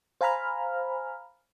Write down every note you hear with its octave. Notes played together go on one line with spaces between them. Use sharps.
C5 F5 G#5 A#5 B5 F6